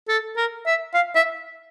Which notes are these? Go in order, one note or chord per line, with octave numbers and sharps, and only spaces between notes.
A4
A#4
E5
F5
E5